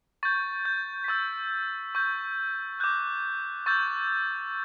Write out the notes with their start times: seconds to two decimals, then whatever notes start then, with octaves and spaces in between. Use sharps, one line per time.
0.23 C#6 G6 A6
0.65 G6
1.04 B6
1.08 C#6 E6 G6 A6
1.95 C#6 G6
2.80 D6 F#6 G6
3.66 C#6 E6 G6 A6